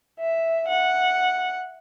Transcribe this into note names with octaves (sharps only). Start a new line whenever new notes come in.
E5
F#5